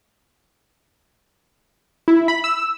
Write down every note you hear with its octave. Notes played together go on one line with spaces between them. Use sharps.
E4
B5
E6